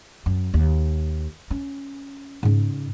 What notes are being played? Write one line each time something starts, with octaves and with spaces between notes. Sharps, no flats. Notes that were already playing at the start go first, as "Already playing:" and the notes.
F#2
D#2
C#4
G#2 C#3